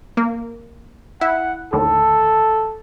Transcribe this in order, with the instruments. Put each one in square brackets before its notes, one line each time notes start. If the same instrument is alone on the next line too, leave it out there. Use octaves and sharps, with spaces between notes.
[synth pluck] A#3
[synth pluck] E4 [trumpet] F#5
[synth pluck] D#2 A2 D3 [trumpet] A4